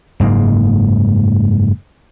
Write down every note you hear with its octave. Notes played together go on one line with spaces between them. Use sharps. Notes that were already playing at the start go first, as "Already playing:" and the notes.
F#1 G#2 G#3 A#3